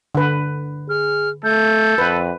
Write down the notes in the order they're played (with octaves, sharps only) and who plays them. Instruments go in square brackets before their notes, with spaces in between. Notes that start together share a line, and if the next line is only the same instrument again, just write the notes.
[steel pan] D3 B4
[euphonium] G#4 [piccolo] F6
[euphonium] A3 [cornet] A4 [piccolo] G6
[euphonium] F2 [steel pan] B4